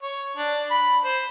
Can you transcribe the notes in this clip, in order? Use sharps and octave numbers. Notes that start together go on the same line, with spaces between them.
C#5
D4
B5
C5